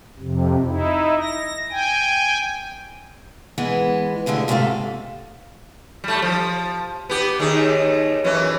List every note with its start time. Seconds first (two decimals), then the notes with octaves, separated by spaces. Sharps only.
0.19 F2 C3
0.66 D#4 E4
1.22 A#6
1.70 G5 G#5
3.58 E3 G#3 B3
4.26 G2 D3 G#3 A3 G4
4.48 G#2 C3 A3 G#4 A4 F5
6.04 G3 A3
6.22 F3
7.09 B3 G4
7.39 D#2 D#3 G#4
8.24 F#2 E3 C#4